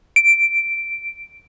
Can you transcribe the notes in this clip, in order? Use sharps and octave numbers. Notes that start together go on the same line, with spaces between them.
D7